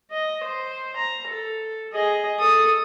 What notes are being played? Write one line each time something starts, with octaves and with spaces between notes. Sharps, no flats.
D#5
C5
A#5
A4
G#4 D#5
A4 D#6